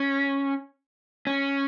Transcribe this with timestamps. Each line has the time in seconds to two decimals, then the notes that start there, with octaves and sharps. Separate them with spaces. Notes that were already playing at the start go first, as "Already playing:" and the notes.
Already playing: C#4
1.27 C#4